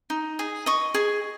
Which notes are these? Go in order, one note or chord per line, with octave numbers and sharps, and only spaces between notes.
D#4
G#4
D#5 C#6
G#4